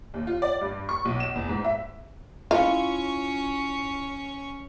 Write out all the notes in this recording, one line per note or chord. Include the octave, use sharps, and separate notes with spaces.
D#2
F4
D5
G2
C#6
B1
E7
E2
G#2
E5
C#4 E4 F4 C#5 F5